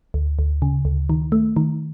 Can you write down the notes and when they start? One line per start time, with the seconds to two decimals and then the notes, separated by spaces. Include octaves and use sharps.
0.14 D2
0.39 D2
0.62 C#3
0.85 D2
1.10 D#3
1.32 A3
1.56 D#3